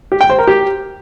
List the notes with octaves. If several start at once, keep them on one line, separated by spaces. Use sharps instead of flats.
G4
G5
C5
A#4
G4